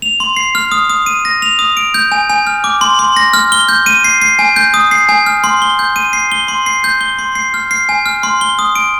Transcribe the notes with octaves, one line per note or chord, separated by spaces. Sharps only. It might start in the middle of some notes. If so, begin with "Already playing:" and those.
F7
C6
C7
F6
D#6
D#6
D#7
A#6
F7
D#6
D7
G6
G#5
G#5
F6
D6
C6
C6
A#6
F6
G7
G6
D#7
C7
C7
G#5
G6
D#6
C7
G#5
F6
C6
G7
G6
D#7
C7
G7
C6
C7
G6
G7
C6
C7
F6
C7
G#5
F6
C6
G7
D#6
D7